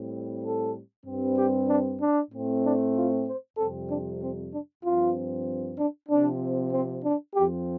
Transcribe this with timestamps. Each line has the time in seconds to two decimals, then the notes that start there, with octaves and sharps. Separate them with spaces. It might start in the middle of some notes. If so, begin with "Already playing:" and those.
Already playing: A2 G3 C4
0.43 A4
1.06 G2 G3 C4
1.37 G4
1.69 D4
2.00 D4
2.31 A2 A3 C4
2.64 D4
2.95 F4
3.26 C5
3.57 F2 C3 G3 C4 A4
3.89 D4
4.21 C4
4.52 D4
4.83 G2 F3 C4 F4
5.78 D4
6.09 C3 F3 C4 D4
6.72 C4
7.04 D4
7.34 F2 F3 C4 G4